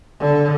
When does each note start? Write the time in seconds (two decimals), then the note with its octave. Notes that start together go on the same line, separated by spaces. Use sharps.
0.20 D3